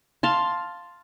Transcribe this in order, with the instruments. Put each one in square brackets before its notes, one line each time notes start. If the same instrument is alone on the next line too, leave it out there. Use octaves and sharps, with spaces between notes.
[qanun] F5 A5 C6